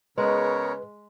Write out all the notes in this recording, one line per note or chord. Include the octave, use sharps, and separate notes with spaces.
C#3 G#3 B3 A#4 B4 C#5